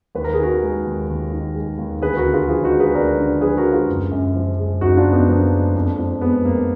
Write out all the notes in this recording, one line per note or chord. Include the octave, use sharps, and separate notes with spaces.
D#2 B4
A#4
G#4
D#3 F#4 A#4
G#3
D#2
D#2
D#3
G#3
D#2
D2 G#4 B4
F#4 A#4
D3
F4 G#4
F3 F4 G#4
D#4 F#4
G#3
G#4 B4
D2 A#4 D5
D3
F3 G#4 B4
F#4 A#4
G#3
F4 G#4
F#1
F#2
F3
G#3
F#1 D#4 F#4
D4 F4
F#2
B3 D#4
F3 A#3 D4
G#3
F2
F3
G#3 B3
F2 A#3